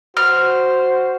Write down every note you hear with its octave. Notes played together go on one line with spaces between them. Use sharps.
F#4 C5 F6